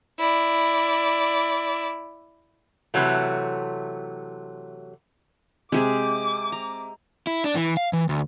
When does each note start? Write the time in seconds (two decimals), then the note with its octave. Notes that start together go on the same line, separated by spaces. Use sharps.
0.19 E4 D5
2.94 C3 E3 F#3 A3
5.72 C3 G#3 G4 G#4 D6
6.52 A#5
7.27 E4
7.44 D4
7.55 E3
7.77 F5
7.93 E3
8.09 D2